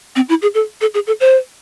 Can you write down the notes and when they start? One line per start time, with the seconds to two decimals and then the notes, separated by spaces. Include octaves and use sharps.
0.16 C4
0.29 E4
0.42 G#4
0.54 A4
0.81 A4
0.94 G#4
1.07 A4
1.20 C5